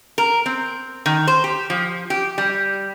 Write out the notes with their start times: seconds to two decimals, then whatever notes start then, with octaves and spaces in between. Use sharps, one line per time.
0.18 A#4
0.46 C4
1.06 D#3
1.27 C5
1.44 G4
1.70 F3
2.10 G4
2.38 G3